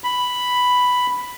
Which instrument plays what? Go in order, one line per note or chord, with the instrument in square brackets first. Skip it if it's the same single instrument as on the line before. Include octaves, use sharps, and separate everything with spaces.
[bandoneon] B5